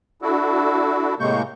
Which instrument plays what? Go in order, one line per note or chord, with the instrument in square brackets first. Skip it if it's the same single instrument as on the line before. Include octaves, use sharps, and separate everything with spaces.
[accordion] D4 E4 F#4 A4
A2 C3 G#3 A#3 C#6 G6